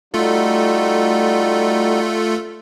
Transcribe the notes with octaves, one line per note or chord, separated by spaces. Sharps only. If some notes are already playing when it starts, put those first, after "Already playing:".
G3 A3 D#4 F4 F#4 A4